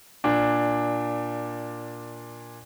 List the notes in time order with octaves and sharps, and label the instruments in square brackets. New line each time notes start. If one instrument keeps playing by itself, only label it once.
[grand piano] A#2 D4